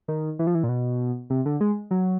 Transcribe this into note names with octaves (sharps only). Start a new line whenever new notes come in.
D#3
E3
F3
E3
A#2
B2
C3
D3
G#3
F#3